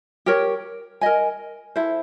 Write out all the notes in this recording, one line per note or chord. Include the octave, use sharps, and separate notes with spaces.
G4 A#4 C#5
A#4 D#5 G#5
E4 A4 C5